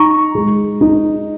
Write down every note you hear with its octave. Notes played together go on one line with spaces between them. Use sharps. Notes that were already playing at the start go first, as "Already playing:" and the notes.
Already playing: D#4 A#5 C#6
G#3
D#4